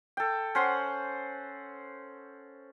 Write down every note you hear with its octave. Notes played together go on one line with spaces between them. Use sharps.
A4 G5
C#4 C5 F#5 C6